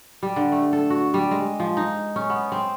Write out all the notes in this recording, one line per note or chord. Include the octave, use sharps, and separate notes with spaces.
G3
D3
A3
A4
F#4
G3
G#3
F3
D#4
C#4
B3
C4